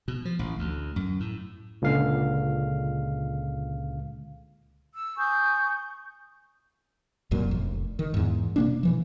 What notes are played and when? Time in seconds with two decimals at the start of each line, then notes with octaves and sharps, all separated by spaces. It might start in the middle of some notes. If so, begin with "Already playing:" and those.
0.08 B2
0.25 F3
0.39 A1
0.59 D2
0.96 F#2
1.20 A2
1.82 C#2 A#2 D3 F5
4.94 E6
5.17 G#5 C#6 D#6 G6
7.31 E1 C2 F#2 A#2
7.51 F1
7.99 D#3
8.14 E2 G#2
8.56 B2 A#3 D4
8.83 B2 E3 F3